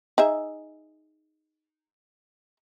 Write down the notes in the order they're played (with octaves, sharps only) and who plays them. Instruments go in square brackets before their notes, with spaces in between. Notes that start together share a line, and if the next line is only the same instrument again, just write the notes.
[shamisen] D#4 G#4 E5